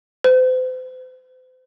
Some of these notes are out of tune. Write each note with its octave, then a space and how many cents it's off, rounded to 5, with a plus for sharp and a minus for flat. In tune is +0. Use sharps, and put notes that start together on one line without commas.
C5 -40